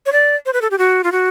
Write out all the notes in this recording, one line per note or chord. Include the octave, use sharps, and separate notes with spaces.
C#5
D5
C5
B4
A4
G4
F#4
F4
F#4